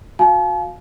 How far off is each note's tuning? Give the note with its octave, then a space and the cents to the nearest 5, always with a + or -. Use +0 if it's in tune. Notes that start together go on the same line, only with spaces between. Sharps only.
F#4 -30 F5 +0 A5 -45